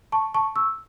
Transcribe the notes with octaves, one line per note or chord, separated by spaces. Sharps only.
A5 C#6
A5 C#6
C#6 E6